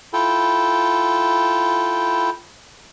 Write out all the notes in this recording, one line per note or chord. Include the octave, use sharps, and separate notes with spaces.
E4 F4 A4 G5